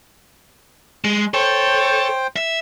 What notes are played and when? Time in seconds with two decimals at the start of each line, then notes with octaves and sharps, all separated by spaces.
1.04 G#3
1.34 A4 C5 C#5 G5
2.36 E5